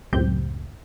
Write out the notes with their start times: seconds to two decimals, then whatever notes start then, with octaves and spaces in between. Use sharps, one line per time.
0.13 C#2 F#2 A2 C4 G4 G6